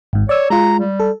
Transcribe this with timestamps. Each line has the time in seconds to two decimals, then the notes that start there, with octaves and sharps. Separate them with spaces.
0.13 G#1 G#2
0.29 C#5 D5 E6
0.50 G#3 F4 A#5
0.80 G3
1.00 A4